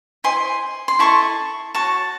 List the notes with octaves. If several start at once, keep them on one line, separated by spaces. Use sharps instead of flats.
E4 C5 D#5 G#5 C6
C6
E4 A4 D#5 A5 C#6
F#4 C#5 A5 C#6